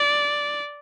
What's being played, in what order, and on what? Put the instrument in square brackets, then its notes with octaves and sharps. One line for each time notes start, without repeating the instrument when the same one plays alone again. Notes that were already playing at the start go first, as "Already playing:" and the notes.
Already playing: [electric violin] D5